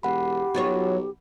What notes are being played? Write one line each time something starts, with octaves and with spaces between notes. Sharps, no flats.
E1 G4 F#5 B5
B1 F#3 F4 C#5